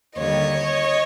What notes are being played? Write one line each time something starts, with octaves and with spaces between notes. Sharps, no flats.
D#2 D3 G3 C#5 D#5